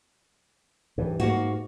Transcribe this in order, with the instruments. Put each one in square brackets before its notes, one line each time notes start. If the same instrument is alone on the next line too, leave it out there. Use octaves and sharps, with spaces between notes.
[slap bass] G2 E3
[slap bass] G#2 [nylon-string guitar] A#3 F#4